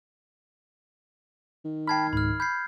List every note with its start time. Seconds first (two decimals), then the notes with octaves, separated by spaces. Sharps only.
1.65 D#3
1.87 G5 A5 B5 F6 G#6 C7
2.13 C#2 G#2 B5 F6
2.40 B5 G6 G#6 C7